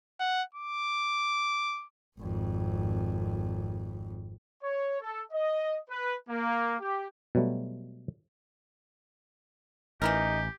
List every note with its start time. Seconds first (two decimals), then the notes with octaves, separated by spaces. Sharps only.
0.20 F#5
0.54 D6
2.18 G#1 F2
4.63 C#5
5.01 A4
5.32 D#5
5.90 B4
6.29 A#3
6.80 G4
7.35 B2 F#3 G3 A3
10.02 A1 E3 D#4 E4 G4 A#4